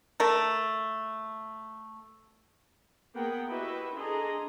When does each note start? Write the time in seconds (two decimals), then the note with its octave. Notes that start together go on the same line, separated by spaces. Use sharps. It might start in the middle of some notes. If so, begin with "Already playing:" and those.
0.20 A3 A4 A#4
3.15 A#3 B3 G#4 A#4 F#5 G5
3.47 E4 F#4 G4 B4 D#5 E5
3.96 D4 G#4 A4 D#5 A#5 C6